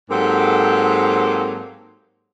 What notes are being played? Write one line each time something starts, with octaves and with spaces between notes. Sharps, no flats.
G#2 F#3 A#3 C4 G4 A4